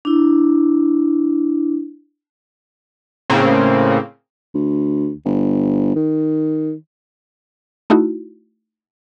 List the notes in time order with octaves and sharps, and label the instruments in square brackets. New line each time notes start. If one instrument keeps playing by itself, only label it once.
[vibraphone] D4 E4
[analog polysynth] A2 C#3 A#3 C4
[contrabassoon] D2
G1
D#3
[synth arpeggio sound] A3 D#4 E4 F#4